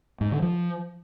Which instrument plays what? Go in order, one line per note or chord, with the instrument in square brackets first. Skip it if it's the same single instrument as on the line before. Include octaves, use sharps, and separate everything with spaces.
[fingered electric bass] G#2
D3
F3